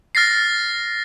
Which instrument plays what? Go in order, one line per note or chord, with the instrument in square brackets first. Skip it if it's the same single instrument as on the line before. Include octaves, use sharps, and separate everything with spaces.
[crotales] F6 A6 A#6 C7